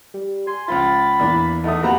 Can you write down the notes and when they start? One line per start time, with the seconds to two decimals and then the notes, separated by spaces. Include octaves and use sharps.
0.14 G3
0.47 G#5 C6
0.68 C#2 F3 F4 B5 A6
1.20 E2 E3 A#3 D4
1.64 E2 E3 A3 D#4 D#6
1.83 F2 A#3 F#4 G4 A4 B4 F#5 A#5